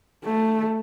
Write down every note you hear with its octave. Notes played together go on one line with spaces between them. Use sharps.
A3